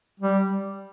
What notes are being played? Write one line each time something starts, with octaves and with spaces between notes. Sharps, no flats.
G3